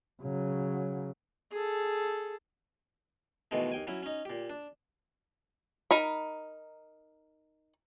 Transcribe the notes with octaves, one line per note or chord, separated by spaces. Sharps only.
C#3 F#3
G#4 A4
B2 D#3 E3 G#3 A3
D#2 G5 G#5
F#3 C#4 E4
C#4 D#4
A#2 G4
D4
D#4 A#4 B5